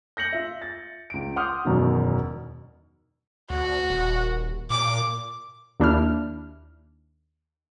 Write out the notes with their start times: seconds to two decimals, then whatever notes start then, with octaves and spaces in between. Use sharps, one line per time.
0.17 G6 A#6 C#7 F#7
0.32 F4 E5
0.62 A6
1.10 C#2 D7
1.36 F#5 C6 D6 D#6 F6 G6
1.65 E1 F#2 B2 D#3
3.50 D2 F#4
3.90 D#1
4.70 A#2 D6
5.80 D#2 D4 E4 F6